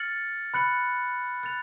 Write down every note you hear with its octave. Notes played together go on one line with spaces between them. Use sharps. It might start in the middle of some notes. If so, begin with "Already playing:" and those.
Already playing: F6 A6 C#7 F#7
B5 F#6 C#7 F#7
F#6 A6 F7